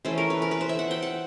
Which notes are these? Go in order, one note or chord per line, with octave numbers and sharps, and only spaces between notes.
E3 A3 C#4 C5
A#4
B4
A#4
B4
C5
E5
F#5
G5
F#5